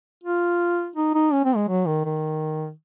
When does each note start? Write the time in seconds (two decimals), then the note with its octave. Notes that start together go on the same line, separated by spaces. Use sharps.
0.24 F4
0.96 D#4
1.15 D#4
1.33 C#4
1.45 C4
1.56 G#3
1.68 F#3
1.86 D#3
2.06 D#3